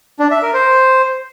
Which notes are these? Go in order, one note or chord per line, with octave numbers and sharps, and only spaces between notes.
D4
E5
A#4
C5